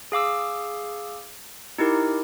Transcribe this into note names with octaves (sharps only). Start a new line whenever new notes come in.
G#4 F5 D6 E6
D#4 E4 G4 A#4